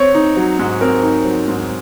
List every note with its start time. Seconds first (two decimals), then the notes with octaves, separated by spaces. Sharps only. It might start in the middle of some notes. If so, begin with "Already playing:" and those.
Already playing: C4 C#5
0.15 D#4
0.37 F#3
0.59 G#2
0.81 C4 A#4
1.03 D#4
1.25 F#3
1.48 G#2